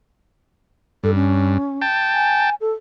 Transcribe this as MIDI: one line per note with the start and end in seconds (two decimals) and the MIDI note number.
1.04 1.58 43
1.04 1.11 69
1.15 1.79 61
1.82 2.50 79
1.82 2.50 81
2.13 2.55 80
2.61 2.72 69